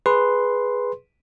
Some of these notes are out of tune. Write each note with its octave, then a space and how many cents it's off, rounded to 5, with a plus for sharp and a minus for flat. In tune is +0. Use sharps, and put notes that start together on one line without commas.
G#4 +0 B4 +0 C6 +0